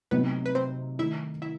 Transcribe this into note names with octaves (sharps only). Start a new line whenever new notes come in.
C3 F#3 A3 B3 D#4 B4
B4
C4 C5
D#3 A3 D#4 E4 E5
E4 E5